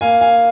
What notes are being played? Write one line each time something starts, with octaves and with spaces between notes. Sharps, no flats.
A#3 F5 G#5
F5 G#5